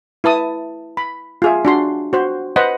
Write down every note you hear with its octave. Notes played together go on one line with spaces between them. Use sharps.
E4 B4 A5 D#6
B5
F4 G#4 E5
D4 F#4 C6
F#4 C5
B4 C5 D#5 F#5 B5